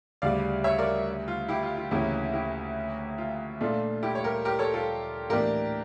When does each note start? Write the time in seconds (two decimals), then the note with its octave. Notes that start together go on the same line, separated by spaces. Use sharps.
0.22 D2 C#3 G3 D5 F5
0.64 C#5 E5
0.78 A#4 D5
1.28 F4
1.48 E4 G4
1.63 F4
1.77 F4
1.91 D2 C#3 E3 A#3 C#4 E4 G4
2.34 E4 G4
3.18 F4
3.61 A#2 A3 D4 F4
4.03 E4 G4
4.15 C#5
4.24 G4 A#4
4.45 G4 A#4
4.59 A4 C#5
4.74 F4 A4
5.29 A2 E3 A#3 D4 G4 A#4